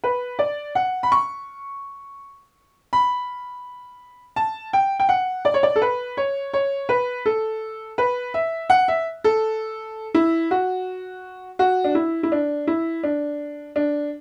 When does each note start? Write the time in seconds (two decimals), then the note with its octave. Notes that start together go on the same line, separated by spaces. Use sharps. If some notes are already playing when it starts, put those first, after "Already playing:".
0.04 B4
0.39 D5
0.75 F#5
1.03 B5
1.12 C#6
2.93 B5
4.36 A5
4.73 G5
4.99 G5
5.09 F#5
5.45 D5
5.54 C#5
5.63 D5
5.76 A4
5.82 B4
6.17 C#5
6.53 C#5
6.89 B4
7.26 A4
7.98 B4
8.34 E5
8.70 F#5
8.88 E5
9.24 A4
10.14 E4
10.51 F#4
11.59 F#4
11.84 D4
11.95 E4
12.23 E4
12.32 D4
12.67 E4
13.03 D4
13.76 D4